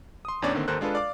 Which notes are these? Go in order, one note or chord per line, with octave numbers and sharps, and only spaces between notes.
C6 D#6
E2 A2 C#4 D4 C#5 D5
D3 D#3 A#3 C4
G#1 D#2 A4 A#4 C5 F#6
G#3 D4 F4 A4 B4
D5 F5 D6